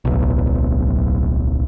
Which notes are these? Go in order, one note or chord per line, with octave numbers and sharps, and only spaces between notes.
D1 B1